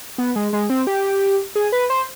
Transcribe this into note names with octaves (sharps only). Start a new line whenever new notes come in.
B3
G#3
G#3
C4
G4
G#4
B4
C5